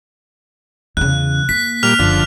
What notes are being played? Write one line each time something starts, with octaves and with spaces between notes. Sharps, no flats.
E2 C#3 F#6
A#3 B6
A#2 G3 F6 F7
F#1 D3 F3